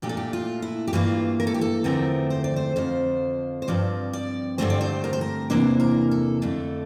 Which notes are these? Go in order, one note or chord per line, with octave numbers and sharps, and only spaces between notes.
A#2 A3 D4 G4
A4
G4
F4
E4
G4
G2 E3 A#3 F4
A#4
A4
G4
A4
E2 D3 F3 A3 C4 A#4
C5
D5
C5
F2 D3 F3 C5
C5
G2 F3 C4 D5
D5
G2 D3 A3 C4 C5
D5
C5
A#4
C5
A#4
E2 C3 E3 A#3 D4 C5
A#4
A4
F2 D3 A3 D4 A4